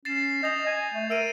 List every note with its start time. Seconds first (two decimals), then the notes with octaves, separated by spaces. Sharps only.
0.05 C#4 A6 C7 E7
0.43 D#5 G6 F7
0.67 G#5
0.94 A3
1.10 A#4 E6 D7 D#7